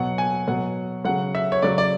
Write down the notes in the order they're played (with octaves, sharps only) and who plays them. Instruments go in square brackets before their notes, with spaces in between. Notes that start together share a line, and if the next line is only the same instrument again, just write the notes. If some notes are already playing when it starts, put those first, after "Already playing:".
Already playing: [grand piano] B2 F#3 F#5
G#5
B2 F#3 F#5
C#3 F#3 F#5
E5
C#5
C#3 F#3 D5
D5